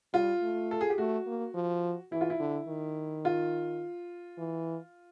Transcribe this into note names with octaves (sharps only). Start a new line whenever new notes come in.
G3 F4
A3
A4
G#4
G4
A3 F#4
A#3
F3
E3 E4
F4
E4
D3
D#3
F4
E3